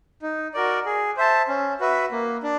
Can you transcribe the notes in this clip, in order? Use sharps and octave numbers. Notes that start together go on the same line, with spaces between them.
D#4
F#4 A#4 D5
G#4
C5 E5 A5
C#4
F#4 B4 E5
A#3
D4